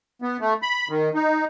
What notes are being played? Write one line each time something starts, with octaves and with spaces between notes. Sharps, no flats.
B3
A3
B5
D#3
D#4